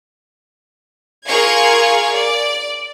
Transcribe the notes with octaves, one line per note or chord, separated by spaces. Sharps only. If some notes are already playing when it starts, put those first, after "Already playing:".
F4 G#4 A#4 F5 C#6 G#6
D5